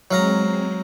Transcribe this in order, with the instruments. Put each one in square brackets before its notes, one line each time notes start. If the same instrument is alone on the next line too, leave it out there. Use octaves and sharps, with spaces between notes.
[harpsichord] F#3 F5 A#5 [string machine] G#3 C4